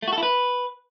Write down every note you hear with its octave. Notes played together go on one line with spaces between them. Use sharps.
A3
F#4
A4
E4
B4